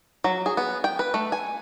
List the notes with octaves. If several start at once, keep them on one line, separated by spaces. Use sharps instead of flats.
F#3
G#4
B3
G5
B4
A3
G#5